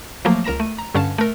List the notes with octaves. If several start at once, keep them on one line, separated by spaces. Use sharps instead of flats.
F3 F#3 A3 A#3
C#2 A#4 A#5 A#6 E7
A3 D#7
A#5
G2 D3 C#4 F5 A5
A3 A#4